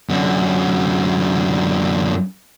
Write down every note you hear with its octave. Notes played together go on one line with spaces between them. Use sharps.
F#2 D3